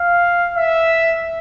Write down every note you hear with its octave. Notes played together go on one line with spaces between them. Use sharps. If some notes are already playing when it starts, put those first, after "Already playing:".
Already playing: F5
E5